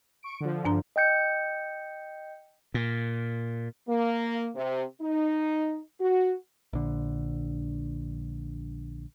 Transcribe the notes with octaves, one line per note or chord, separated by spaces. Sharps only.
C#6 D7
D3 F3
G2 D4 A#5
D#5 G5 G6 C#7
A#2
A#3
C3
D#4
F#4
A#1 D3